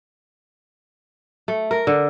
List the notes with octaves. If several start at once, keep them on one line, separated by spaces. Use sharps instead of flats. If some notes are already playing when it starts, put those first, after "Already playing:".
A3
A#4
D3